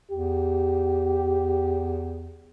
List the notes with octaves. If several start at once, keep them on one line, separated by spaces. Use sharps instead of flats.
E2 G4